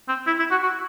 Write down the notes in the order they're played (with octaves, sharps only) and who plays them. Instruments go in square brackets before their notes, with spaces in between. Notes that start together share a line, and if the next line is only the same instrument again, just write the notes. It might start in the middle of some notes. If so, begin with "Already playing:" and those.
[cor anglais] C4
E4
E4
F#4
F#4